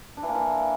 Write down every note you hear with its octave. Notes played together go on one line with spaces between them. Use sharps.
D4
E3
A#3
E3